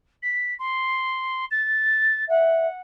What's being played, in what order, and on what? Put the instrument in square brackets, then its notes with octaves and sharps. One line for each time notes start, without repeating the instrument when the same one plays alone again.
[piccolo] B6
C6
A6
[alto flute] E5 [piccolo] F#5